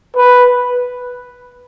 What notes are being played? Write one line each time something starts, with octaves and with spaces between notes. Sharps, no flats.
B4